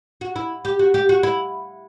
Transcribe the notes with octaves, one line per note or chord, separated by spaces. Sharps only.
F#4
E4
G4
F#4
G4
F#4
E4